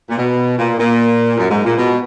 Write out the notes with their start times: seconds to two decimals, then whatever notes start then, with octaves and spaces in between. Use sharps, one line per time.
0.10 A#2
0.18 B2
0.58 A#2
0.78 A#2
1.38 F#2
1.50 G#2
1.64 A#2
1.77 B2